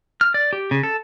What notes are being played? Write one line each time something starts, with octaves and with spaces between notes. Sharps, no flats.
F6
D5
G4
C#3
A4